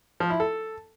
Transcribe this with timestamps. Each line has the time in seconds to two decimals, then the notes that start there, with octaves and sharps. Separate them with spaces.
0.20 F3
0.30 E4
0.40 A4